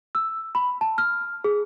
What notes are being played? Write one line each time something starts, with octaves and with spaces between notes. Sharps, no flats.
E6
B5
A5
F6
G#4